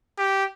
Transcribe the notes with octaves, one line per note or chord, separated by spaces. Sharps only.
G4